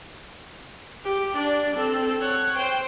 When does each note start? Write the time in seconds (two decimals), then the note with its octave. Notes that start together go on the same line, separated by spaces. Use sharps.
1.04 G4
1.33 D4 D5
1.76 C4 A4
2.19 C#5 F#5
2.57 C5 G5